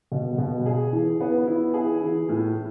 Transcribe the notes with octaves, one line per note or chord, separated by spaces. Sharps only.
B2
B2
G#4
E3
B3
E4
G#4
E3
A2